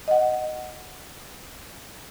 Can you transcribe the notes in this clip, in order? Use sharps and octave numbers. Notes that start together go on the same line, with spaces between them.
D#5 F#5